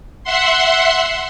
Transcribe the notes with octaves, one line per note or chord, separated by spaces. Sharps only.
E5 F#5 C6